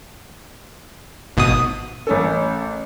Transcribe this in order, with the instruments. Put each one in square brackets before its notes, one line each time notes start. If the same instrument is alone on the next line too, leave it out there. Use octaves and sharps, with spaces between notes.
[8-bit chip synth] G#1 B2 D#6
[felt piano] A1 C#4 A4